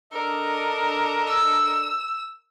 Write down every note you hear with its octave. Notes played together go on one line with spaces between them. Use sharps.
D4 A4 A#4 D#5
E6